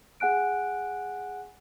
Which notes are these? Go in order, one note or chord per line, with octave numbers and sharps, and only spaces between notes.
G#4 F#5 G#5 F#6 D7